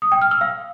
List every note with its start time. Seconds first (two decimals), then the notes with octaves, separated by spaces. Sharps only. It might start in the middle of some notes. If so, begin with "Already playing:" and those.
0.02 D#6
0.12 G5
0.22 F6
0.31 E6
0.41 F5